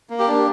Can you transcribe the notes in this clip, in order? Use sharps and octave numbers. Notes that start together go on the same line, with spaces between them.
A#3
G4
D4